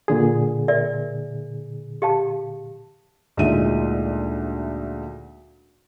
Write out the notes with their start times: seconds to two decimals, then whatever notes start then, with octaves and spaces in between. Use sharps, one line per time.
0.08 A#2 D3 G#4
0.68 A#4 D5 E5
2.02 G4 F5 A5
3.37 D2 A#2 G#3 D#4 E5 D#7